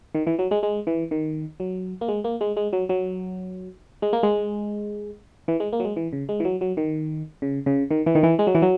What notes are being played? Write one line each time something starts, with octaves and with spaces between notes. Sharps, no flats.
D#3
E3
F#3
G#3
G#3
E3
D#3
F#3
A#3
G#3
A#3
G#3
G#3
F#3
F#3
G#3
A#3
G#3
E3
G#3
A#3
F#3
G#3
E3
C#3
G#3
E3
F#3
F#3
D#3
C#3
C#3
D#3
E3
D#3
E3
G#3
F#3
E3
F#3